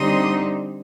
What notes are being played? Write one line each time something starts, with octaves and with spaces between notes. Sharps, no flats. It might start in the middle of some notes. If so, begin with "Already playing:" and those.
Already playing: D3 G3 C4 D#4 C6 D#6